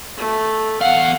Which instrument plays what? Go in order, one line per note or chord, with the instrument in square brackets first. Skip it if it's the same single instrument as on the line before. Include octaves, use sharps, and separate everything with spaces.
[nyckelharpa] A3
[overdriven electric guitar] E2 F5 [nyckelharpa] F#5